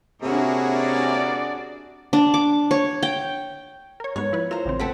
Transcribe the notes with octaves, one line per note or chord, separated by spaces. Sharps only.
C3 A#3 C#4 D4 E4 F#4 G#4
D5
D4
D6
C#5
G5
A#4 C#5
G#2 B3 C#5
F3 E4 B4
E4 F4 A#4 C5 A#5
A1 C#3 C4
A3 B3 C4 A4 F#5 B6